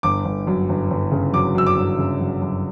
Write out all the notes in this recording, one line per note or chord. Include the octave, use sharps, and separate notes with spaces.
G1 D6
G1
F#2
G1
G1
C#3
F#3 D6
F#2 E6
D6
G1
C#3
F#3
F#2